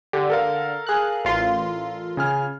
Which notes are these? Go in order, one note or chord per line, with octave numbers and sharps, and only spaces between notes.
D3 G4
A4 A#4 F5
G#4 F#6
A1 F4 C6
C#3 G#5 F6